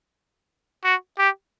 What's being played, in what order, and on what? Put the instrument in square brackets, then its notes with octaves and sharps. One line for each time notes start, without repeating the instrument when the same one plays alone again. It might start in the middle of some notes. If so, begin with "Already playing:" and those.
[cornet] F#4
G4